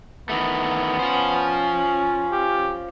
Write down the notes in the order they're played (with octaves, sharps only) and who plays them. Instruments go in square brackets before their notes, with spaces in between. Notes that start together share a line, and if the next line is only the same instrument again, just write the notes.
[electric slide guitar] D#3 E3 A3 [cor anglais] B3
[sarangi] C#4 [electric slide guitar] F4 C5
[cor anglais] G4